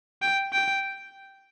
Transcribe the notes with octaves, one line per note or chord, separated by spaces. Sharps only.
G5
G5